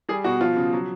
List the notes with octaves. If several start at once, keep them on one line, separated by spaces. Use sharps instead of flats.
G3 G#4
B2 F#4
F3 F4
C#3
F#3